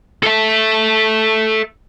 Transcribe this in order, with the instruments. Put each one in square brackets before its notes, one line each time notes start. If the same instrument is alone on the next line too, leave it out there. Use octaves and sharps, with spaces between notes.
[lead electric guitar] A4 E5